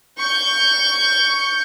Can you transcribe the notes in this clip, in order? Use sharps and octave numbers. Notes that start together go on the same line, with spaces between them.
C#6 G6